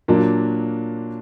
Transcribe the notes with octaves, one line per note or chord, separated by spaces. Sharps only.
A#2 F#3 A#3 D4